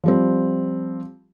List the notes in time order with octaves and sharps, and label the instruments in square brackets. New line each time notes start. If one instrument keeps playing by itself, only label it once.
[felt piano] F3 G3 C4